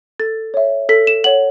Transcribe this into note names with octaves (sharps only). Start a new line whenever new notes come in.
A4 A6
C#5 E5
A4 B6
E7
C#5 F#5 F#7